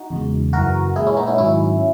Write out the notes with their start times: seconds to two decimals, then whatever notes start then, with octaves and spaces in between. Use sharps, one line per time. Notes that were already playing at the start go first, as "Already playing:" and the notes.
Already playing: D#4 F#4
0.10 E2 C#3 G#3
0.53 F#2 C#3 E3 F#4 A#4
0.96 A#2 G#3 E4 G#4
1.07 C#4 E4
1.17 B3 D#4
1.27 C#4 E4
1.38 G#2 D#3 F#3 C#4 E4